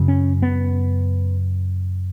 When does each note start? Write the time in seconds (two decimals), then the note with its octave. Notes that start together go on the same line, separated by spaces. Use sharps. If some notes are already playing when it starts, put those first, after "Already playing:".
Already playing: F#2 C#3
0.08 C#4
0.42 B3